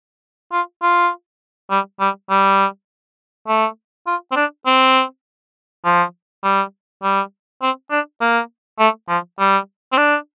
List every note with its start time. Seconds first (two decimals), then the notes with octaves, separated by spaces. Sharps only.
0.52 F4
0.82 F4
1.71 G3
2.00 G3
2.30 G3
3.48 A3
4.07 F4
4.32 C4
4.36 D4
4.66 C4
5.85 F3
6.44 G3
7.03 G3
7.62 C4
7.91 D4
8.21 A#3
8.79 A3
9.09 F3
9.40 G3
9.92 C4
9.98 D4